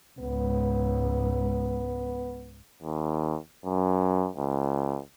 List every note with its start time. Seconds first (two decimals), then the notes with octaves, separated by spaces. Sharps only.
0.19 C#2 G#2 B3
2.83 D#2
3.65 F#2
4.37 C#2